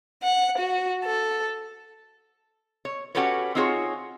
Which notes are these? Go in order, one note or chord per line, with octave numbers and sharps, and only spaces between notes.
F#5
F#4
A4
C#5
C#4 F#4 G4 A4 B4 C#5
C4 D#4 F4 F#4 G#4 C#5